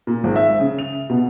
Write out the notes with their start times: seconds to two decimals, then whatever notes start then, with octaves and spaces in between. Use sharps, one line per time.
0.07 A#2
0.24 G#1
0.36 E5
0.60 C#3
0.79 F7
1.10 B2